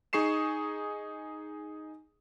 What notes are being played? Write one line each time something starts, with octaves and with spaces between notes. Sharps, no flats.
D#4 G#4 C#6 C7 E7